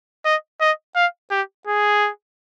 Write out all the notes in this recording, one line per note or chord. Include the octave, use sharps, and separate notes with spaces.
D#5
D#5
F5
G4
G#4